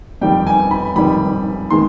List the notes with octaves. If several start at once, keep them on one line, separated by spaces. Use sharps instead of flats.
F2 D#3 G3 G5
G#5
B5
F2 D#3 G3 B5
D#3 G#3 C6